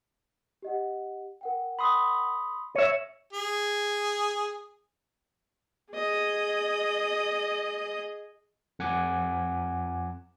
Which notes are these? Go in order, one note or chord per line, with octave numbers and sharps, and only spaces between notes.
G4 D#5 F#5
A#4 F#5 G5
B5 C6 D#6
C#5 E5 D#7
G#4
G#4 D#5
F2 F#5 G#5 D6